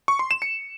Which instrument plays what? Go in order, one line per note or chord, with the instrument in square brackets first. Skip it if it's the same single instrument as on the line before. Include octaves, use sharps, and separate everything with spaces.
[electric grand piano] C#6
C6
E7
C#7